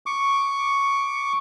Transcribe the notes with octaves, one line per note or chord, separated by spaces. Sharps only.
C#6 D6